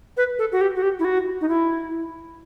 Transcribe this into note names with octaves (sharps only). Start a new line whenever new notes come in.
B4
A4
F#4
G4
F#4
G4
E4
F#4
D#4
E4